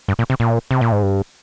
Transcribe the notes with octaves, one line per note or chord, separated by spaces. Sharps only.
G2
A#2
C3
A#2
C3
A#2
G#2
G2